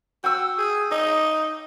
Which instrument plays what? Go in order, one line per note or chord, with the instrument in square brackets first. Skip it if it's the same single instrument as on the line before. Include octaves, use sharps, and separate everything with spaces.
[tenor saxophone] F#4 [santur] G5 E6
[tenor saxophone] G#4
[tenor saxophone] D#4 [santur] D#5